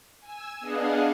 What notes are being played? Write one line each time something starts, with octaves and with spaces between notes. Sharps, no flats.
G#5 E6
B3 D4 G#4 D#5 F5 F#5